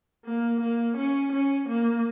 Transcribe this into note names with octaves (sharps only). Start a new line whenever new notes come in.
A#3
A#3
C#4
C#4
A#3